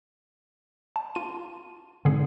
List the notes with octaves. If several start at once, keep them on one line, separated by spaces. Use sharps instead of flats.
A5
F4 D#7
G#2 D3 D#3 C4 G#4